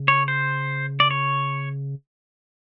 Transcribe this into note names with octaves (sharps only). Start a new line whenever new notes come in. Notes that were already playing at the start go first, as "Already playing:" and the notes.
Already playing: C#3
C#5
C5
D5
C#5